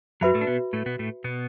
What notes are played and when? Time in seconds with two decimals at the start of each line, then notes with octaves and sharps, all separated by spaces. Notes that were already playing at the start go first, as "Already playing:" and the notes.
0.21 F#2 F#3 F#4 B4 E5 B5
0.34 A2 A3
0.41 D4
0.47 B2 B3
0.73 A2 A3
0.86 B2 B3
0.99 A2 A3
1.24 B2 B3